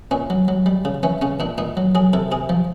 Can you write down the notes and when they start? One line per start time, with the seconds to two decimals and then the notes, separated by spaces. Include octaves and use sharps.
0.11 A#2 C#4
0.30 F#3
0.48 F#3
0.66 G3
0.85 C#3
1.03 E3 C#4
1.21 C#3 C#4
1.40 A#2 D4
1.58 A#2 D#4
1.77 F#3
1.95 F#3 G#4
2.13 C3 A4
2.32 C3 G#4
2.49 F3